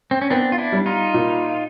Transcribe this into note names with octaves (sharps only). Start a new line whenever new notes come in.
C4
C#4
B3 C4 D4
F4
D4 E4
G3
D#4 F4
A#2